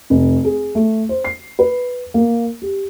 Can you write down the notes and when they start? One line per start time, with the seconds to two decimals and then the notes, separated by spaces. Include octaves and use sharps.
0.10 F1
0.45 G#4
0.75 A3
1.09 C5
1.24 C7
1.59 B4
2.14 A#3
2.62 G4